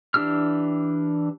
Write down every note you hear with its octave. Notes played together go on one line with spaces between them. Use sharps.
E3 D4 G4 E6 F6